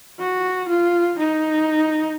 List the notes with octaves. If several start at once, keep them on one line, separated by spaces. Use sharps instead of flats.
F#4
F4
D#4